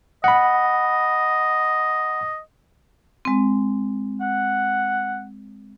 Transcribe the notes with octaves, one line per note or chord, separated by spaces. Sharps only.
D#5 F#5 B5
G#3 C4
F#5